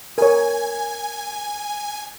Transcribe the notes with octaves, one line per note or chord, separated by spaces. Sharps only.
A#4 C#5 G#5